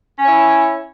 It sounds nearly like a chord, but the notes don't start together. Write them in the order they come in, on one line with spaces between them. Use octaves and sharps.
C#4 C#5 E4